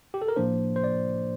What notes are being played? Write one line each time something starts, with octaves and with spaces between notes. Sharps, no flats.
G4
A4
A#4
A2 F3 A#3 D4 C5
C5
D5